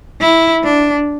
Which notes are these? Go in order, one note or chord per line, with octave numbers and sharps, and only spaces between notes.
E4
D4